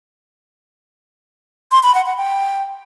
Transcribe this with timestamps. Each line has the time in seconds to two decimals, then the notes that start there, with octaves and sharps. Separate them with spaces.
1.72 C6
1.83 B5
1.94 F#5
2.06 F#5
2.17 G5